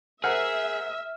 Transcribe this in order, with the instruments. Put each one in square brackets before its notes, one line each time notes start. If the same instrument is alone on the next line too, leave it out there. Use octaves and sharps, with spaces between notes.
[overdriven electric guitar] G#4 [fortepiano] A#4 C5 F#5 [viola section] E5 [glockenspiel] F6